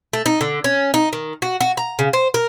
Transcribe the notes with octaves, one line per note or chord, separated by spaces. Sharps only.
A3
D#4
D3
C#4
D#4
D#3
F#4
F#4
A#5
C#3
C5
A#4